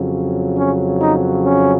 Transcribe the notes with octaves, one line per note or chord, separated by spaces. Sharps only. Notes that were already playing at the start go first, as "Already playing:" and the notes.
Already playing: F2 C#3 F#3
C#4
D#4
C#4